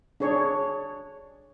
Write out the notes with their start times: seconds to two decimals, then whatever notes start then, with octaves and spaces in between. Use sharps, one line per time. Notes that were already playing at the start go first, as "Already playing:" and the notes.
0.20 D4 G#4 C#5